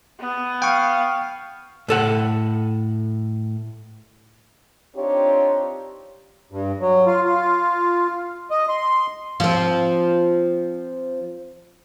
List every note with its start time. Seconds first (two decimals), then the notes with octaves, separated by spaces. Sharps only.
0.20 B3
0.62 F5 G5 C#6
1.88 A2 A4 F#5
4.96 C4 D4 D#4 F4 G4 C#5
6.52 G2
6.81 F#3
7.07 F4
7.25 F4
8.51 D#5
8.68 C6
9.40 F3 C4